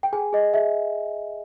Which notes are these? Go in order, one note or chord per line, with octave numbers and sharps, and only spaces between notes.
G5
G#4 G#5
G#4 D#5
G#4 E5